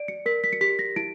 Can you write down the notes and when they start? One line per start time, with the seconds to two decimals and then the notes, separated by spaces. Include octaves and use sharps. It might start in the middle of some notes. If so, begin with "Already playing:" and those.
Already playing: D5 D7
0.08 C#7
0.26 A#4 B6
0.44 B6
0.53 C#7
0.61 G4 B6
0.79 A#6
0.96 E4 D7